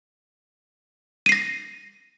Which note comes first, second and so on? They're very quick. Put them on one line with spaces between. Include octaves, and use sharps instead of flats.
D#7 C7 A#6